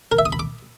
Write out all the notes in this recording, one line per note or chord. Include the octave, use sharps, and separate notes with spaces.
A#4
E5
D#6
B5
D6